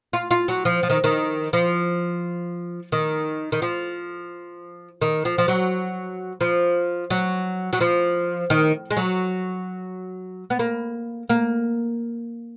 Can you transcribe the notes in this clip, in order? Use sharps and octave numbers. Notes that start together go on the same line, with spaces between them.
F4
F4
F#3
F3
F3
D#3
D#3
F3
D#3
D#3
F3
D#3
F3
F3
F#3
F3
F#3
F#3
F3
D#3
G#3
F#3
B3
A#3
A#3